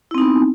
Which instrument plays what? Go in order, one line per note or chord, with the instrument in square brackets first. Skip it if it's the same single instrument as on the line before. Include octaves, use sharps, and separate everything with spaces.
[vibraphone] E4
C4
D#4
B3